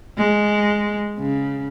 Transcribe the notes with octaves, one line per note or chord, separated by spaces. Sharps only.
G#3
C#3